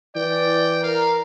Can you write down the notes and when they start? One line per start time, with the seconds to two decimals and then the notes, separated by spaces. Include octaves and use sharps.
0.16 E3 D5 G5
0.84 A#4 F5 A#5